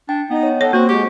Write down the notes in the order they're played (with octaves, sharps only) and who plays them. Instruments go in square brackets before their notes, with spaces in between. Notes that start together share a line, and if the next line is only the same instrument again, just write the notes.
[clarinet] D4 [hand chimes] G5
[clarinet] B3 [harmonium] D#4
[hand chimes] C#5
[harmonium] A4 [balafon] C#5 [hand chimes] F#5
[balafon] A#3 [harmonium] C4 [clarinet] F#4
[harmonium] G#3 [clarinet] G4 [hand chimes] C#6